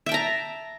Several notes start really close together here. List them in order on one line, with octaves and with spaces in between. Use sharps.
E5 G5 A5 A#5